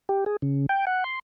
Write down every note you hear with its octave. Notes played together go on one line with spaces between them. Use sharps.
G4
G#4
C#3
G5
F#5
C6